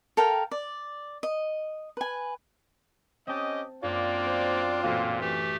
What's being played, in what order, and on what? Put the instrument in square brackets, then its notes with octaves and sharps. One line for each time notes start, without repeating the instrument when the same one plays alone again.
[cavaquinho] A4 A#4 F5 G5
D5
D#5
B4 G#5
[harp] C4 A5 [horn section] C#4 G4 D#5
[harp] F#2 [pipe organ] A#3 [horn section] C4 D4 F4 [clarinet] D5
[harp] B3 C5
[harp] A1 F#4 D#7 [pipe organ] A#2 [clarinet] A#3
[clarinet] E3 [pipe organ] A3 G4